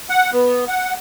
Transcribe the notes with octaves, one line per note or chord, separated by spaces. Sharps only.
F#5
B3
F#5